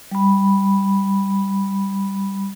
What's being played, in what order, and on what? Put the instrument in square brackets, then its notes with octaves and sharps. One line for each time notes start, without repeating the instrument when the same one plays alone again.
[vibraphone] G3 B5